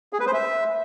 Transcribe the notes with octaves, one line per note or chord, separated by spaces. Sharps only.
G#4
B4
C5
E5